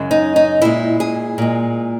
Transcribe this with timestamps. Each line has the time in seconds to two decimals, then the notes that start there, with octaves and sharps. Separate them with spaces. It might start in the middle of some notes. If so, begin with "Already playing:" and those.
Already playing: F#2 C#3 G#3
0.11 D#4
0.36 D#4
0.62 A#2 G#3 E4
1.00 G#4
1.38 A#2 G#3